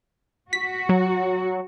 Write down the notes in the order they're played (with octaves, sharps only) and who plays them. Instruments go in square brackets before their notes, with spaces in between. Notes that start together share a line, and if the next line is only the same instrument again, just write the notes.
[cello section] F#4 [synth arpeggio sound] B6
[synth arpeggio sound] F#3